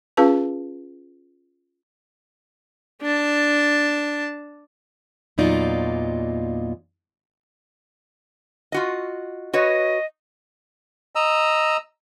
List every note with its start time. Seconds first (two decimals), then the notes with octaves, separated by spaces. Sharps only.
0.17 C#4 F4 G#4 B4 F5 A5
3.02 D4 A5
5.38 E2 A#2 F#3 D#4 F4 D5
8.72 F4 F#4 D#5
9.53 F#4 B4 C#5 D#5
11.15 D#5 A#5 E6